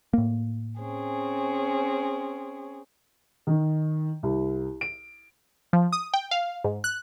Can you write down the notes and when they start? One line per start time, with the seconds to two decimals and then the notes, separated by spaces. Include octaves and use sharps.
0.13 A2 A#3
0.81 C4 C#4 G#4
3.47 D#3
4.23 C2
4.81 D7
5.73 F3
5.92 D#6
6.14 G5
6.31 F5
6.64 G#2
6.84 F#6